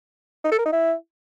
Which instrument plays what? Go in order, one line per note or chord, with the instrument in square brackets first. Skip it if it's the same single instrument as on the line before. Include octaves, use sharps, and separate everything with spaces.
[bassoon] D#4
A4
A#4
D#4
E4